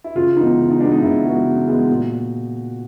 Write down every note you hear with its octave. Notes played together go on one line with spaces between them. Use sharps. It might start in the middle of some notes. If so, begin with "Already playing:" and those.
E4
C#3 F4
E3 G#3 B3 D#4
C#3
D#4
E3 G#3 B3 D4
D#4
C#3 E4
E3 G#3 B3 F#4
C#3
E3 G#3 B3
A#2